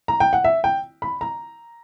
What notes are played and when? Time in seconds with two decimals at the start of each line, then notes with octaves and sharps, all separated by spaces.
0.08 A#5
0.20 G5
0.33 F#5
0.44 E5
0.64 G5
1.02 B5
1.21 A#5